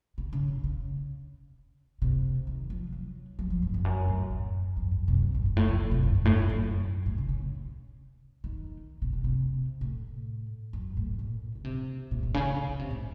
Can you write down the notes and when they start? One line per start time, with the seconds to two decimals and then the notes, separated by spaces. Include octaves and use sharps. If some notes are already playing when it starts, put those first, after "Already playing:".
0.18 C#3
0.33 C#3
0.48 C3
0.64 C#3
2.02 C3
2.47 D#3
2.70 F3
2.92 F#3
3.39 F#3
3.50 F3
3.62 F#2
3.74 F2
3.85 F#2
4.08 A2
4.31 F#2
4.77 F2
4.91 F#2
5.08 C3
5.23 C3
5.34 F#2
5.45 F#2
5.57 A2
5.68 F#3
5.80 F3
5.91 C3
6.03 F#2
6.15 F#2
6.25 A2
6.38 F#2
6.49 F#2
7.06 A2
7.18 C#3
7.29 C#3
8.44 D#3
9.02 C3
9.13 C3
9.24 C3
9.81 A2
10.73 F#2
10.97 A2
11.19 A#2
11.55 C#3
11.64 C3
12.11 A#2
12.23 A#2
12.34 C#3
12.45 C#3
12.69 C#3
12.79 C3
12.91 A2